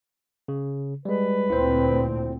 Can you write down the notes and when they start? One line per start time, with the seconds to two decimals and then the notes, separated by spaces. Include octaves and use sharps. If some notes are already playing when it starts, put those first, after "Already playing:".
0.48 C#3
1.05 G3 G#3 B4
1.50 D2 A#2 C4 E4 C5